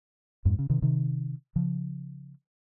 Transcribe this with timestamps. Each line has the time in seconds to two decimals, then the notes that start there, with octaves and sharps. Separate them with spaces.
0.45 F2 G#2
0.59 C#3
0.70 C3 D#3
0.82 C3 D#3
1.56 C#3 F3